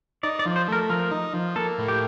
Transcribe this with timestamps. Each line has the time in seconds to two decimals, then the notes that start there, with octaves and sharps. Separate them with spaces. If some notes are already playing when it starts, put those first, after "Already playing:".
0.23 D#4 D5
0.39 D5
0.45 F3
0.56 C5
0.68 A3 A#4
0.89 F3 A#4
1.11 D#4
1.33 F3
1.56 A#3 A4
1.78 A2
1.88 G4